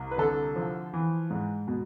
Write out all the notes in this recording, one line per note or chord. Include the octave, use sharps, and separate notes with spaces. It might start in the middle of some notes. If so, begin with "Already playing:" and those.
Already playing: C2
B4
D3 A4
F3
E3
G#2
B2